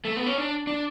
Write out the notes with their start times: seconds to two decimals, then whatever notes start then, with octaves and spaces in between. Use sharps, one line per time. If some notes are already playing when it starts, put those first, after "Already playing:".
0.05 A3
0.17 B3
0.26 C#4
0.38 D4
0.67 D4